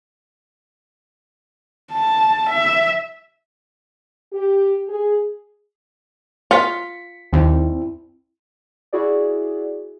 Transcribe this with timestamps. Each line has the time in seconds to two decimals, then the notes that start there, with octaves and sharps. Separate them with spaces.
1.92 A5
2.50 E5
4.33 G4
4.89 G#4
6.51 F4 B6 C#7
7.33 D#2 C4 E4
8.93 E4 F#4 G#4 D5